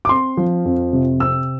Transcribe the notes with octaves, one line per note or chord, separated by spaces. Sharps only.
D6
C4 C6
F3
F2
C3
C4 E6